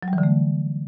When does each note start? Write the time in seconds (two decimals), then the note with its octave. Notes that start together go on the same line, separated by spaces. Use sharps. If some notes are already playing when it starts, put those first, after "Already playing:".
0.03 F#3
0.08 G3
0.13 E3
0.18 D3
0.23 A3